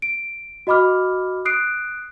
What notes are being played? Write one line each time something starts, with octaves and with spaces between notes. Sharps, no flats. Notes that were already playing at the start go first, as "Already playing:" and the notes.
D7
F#4 D#5 B5 D6 F6
D#6 F#6 C7 D7